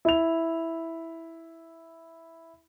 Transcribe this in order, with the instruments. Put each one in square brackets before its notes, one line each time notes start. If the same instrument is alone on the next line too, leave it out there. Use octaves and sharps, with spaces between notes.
[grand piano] E4 F7